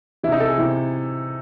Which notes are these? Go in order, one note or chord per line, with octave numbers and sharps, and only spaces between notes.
C3 E3 D#4 E4
A4
G#4
C3 E3